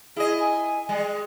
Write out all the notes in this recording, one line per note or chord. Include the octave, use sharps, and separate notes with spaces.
E4 G#4 D#5
G#5
G3 G#3